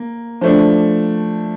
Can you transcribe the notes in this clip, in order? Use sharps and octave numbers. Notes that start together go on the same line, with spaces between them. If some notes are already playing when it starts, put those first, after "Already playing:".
Already playing: A#3
F3 A3 D4